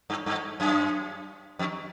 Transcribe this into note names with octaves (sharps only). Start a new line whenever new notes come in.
G2
G2
F#2
F2